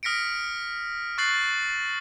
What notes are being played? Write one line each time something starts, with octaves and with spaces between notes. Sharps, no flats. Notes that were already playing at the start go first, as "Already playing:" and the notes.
D#6 F6 A#6 B6 C#7 D7
C#6 F#6 A6 C7 F#7